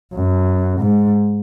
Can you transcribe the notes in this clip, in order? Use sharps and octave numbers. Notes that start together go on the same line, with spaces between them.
F#2
G#2